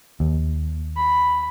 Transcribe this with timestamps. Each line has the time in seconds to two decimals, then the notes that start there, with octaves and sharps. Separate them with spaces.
0.20 D#2
0.97 B5